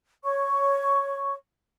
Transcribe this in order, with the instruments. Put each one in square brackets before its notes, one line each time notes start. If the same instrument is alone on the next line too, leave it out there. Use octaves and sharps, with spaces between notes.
[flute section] C#5 C#6